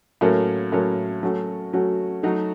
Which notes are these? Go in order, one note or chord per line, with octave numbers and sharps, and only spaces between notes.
A2 F#3 A#3 C#4
A2 F#3 A#3 C#4
F#3 A3 C#4 F#4
F#3 A3 C#4 F#4
F#3 A3 D#4 F#4